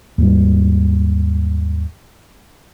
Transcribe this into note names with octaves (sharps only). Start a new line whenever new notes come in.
D#2 G#2 G3